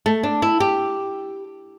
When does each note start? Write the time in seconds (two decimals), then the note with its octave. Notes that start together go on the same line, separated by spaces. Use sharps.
0.06 A3
0.23 D4
0.42 E4
0.60 G4